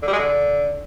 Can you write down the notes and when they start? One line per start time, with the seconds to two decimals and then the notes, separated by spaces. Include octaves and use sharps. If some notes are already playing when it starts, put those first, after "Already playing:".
0.02 D3
0.08 G3
0.13 G#3
0.18 D3